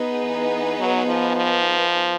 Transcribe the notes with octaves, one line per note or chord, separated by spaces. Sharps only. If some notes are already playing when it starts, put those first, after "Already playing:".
Already playing: B3 D#4 G#4 B4
E3
F#3
F3
F3